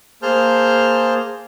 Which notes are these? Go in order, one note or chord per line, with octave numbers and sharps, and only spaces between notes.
A#3 G#4 C5 A5 F6 G6